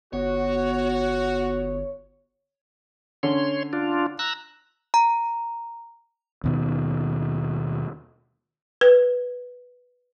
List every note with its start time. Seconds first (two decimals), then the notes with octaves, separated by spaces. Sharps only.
0.13 G1 B3 F#4 C#5
3.23 D3 C#4 C#5 C6
3.73 D4 F4
4.19 A#5 E6 F#6
4.94 A#5
6.44 D#2 B2 D#3
8.81 B4